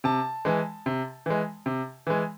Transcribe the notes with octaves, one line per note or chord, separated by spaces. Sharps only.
C3 A5
E3 G#3
C3
E3 G#3
C3
E3 G#3